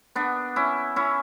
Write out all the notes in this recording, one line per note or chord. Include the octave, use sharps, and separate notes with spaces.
B3 D4
C#4 E4
C#4 E4